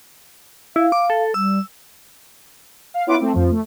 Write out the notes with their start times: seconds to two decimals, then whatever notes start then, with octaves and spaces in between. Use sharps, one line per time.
0.76 E4 F5
0.92 D6
1.10 A4
1.34 G3 E6
2.94 F5
3.07 B3 C#4 E4 F4 B4 D6
3.20 A3 C4
3.34 F2 F3
3.51 A3